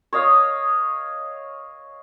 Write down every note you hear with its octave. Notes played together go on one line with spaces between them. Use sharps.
C#5 D#5 F5